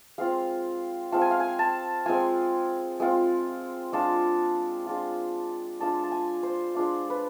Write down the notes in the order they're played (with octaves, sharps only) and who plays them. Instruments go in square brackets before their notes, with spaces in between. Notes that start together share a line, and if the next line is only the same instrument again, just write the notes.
[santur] G#3 C4 F4 F5
G#3 C4 F4 A5
G#5
F5
G#5
A5
G#3 C4 F4 G#5
G#3 C4 F4
G#3 D4 F4 A5
G#3 D4 F4
G#3 D4 F4 A5
A5
G#5
C5
G#3 D4 F4
B4